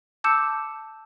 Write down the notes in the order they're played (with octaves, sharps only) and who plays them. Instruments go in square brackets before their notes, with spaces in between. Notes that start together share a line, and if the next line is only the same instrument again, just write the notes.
[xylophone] A5 D6 E6 G6 C#7 E7